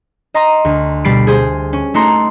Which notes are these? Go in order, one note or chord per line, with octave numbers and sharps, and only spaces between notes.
D#5 A#5 C6 D#6
D2
B2 G3 B5 A6 C7 D7
G#4 C5
C#4
A3 D#4 F#4 A#5 C6